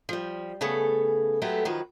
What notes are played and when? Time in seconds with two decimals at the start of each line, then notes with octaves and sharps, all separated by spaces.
0.09 F3 G3
0.61 C#3 A3 B3 G#4 A4
1.42 F#3 G#3 A3 B3 G4 A4
1.65 D#3 F3 F#3 B4